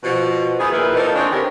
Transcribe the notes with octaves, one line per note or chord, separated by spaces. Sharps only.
B2 F3
D#3 B3 E4 G#4
A#2 D#3 E4 A#4 B4
E3 F3 A#3 D#4 A4 A#4
D#3 C4 D4 G#4 C5 C#5
D3 B3 C4 G4 A#4